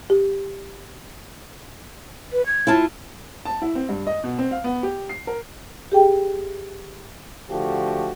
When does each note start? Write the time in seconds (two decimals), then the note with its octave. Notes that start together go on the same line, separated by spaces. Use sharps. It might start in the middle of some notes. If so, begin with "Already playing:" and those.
0.10 G4
2.33 B4
2.46 G#6
2.67 E4 F4 A5
3.45 A5
3.62 E4
3.75 C4
3.89 G2
4.07 D#5
4.24 B2
4.39 C4
4.51 F5
4.64 B3
4.83 G4
5.09 C7
5.27 A#4
5.92 G4 G#4 G5
7.49 D3 F3 A3 F#4 G4